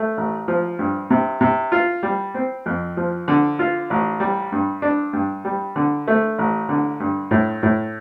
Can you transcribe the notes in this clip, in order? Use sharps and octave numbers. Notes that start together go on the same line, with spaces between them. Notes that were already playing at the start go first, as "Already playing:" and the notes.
Already playing: A3
A1
F3
G2
C3
C3
F4
G3
C4
F2
F3
D3
F4
A1
G3
G2
D4
G2
G3
D3
A3
A1
D3
G2
A2
A2